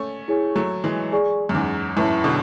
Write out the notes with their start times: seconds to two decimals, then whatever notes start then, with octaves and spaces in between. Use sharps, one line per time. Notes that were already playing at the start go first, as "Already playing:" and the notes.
Already playing: A3 C#4
0.28 E4 G#4 C#5 G#5
0.56 F#3 A3
0.84 E3 G#3
1.12 G#4 D5 G#5 C#6
1.49 F#2
1.54 E2 G#2
1.97 F#2 A2 E4 B4 E5 A5
2.24 B2 D3